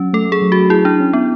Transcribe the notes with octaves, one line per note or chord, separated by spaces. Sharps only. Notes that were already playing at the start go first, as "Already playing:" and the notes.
Already playing: F#3 C#4
A3 A4
G#4
F#3
F#4
E4 G#4
D4
C#4
B3